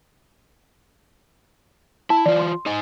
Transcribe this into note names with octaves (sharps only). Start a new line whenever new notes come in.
E4 A5
E3 F4 D5
C6
D#4 D#5 G#5